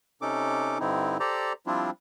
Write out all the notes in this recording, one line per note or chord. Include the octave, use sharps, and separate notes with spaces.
C3 C#4 D#4 A4 D6
G2 D3 C4 D#4 E4
G4 A4 C5 D5 A#5
F3 G3 C4 D4 E4 F4